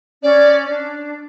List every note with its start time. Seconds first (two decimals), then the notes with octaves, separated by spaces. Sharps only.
0.23 C#4 D5
0.69 D4